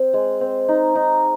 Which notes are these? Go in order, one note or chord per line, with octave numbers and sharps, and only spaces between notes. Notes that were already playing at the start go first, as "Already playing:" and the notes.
Already playing: C4
G#3
C4
D#4
D#4